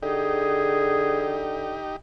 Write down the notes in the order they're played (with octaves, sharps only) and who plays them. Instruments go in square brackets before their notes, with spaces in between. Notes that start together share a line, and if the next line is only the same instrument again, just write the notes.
[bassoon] D3 [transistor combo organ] D#4 G4 [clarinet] G#4